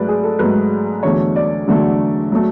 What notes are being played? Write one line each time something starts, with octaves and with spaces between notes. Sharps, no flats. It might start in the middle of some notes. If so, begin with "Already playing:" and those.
Already playing: G#2 F#3 A3 B4 D5
G#4
A4
G#2 F#3 A3 B4
E2 D3 F#3 A3 C#5
D5
E2 D3 F#3 A3
F#3 A3